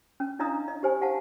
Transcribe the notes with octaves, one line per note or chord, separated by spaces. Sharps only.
C#4
D4 E4 D#5 F5 A#5 D#6
D#5
G4 C5 G#5
G4 F5 F#5 A5